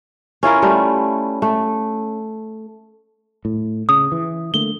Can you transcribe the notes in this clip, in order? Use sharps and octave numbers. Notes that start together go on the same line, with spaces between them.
C#4 E4 F4 A#4
G3 A3
A3
A2
C#3 D#6
E3
D3 A3 A#3 G7